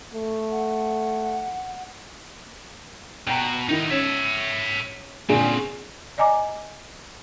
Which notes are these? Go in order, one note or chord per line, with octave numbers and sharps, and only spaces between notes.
A3
F#5
B2 G5 A#5
D3 D#3 D#4 E4
C#4 C#5 E5
A#2 D3 C4 C#4 G#4
D5 D#5 G#5 A#5 D6